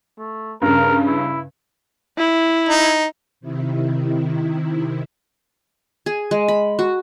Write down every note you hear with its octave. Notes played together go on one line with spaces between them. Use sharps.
A3
G2 C#3 A#4
E4
E4
D#4
C3 D#3 E4
G#4
G#3
B5
F#4